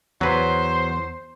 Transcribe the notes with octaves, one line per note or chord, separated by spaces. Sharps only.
E2 F#3 B4 C5